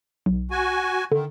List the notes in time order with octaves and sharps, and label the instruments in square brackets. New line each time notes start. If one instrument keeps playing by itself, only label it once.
[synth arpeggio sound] B1
[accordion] F#4 G#5
[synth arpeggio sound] D3 [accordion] D#3